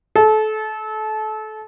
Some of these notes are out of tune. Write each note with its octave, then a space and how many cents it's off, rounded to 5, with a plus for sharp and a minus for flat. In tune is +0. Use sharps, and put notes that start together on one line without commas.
A4 -30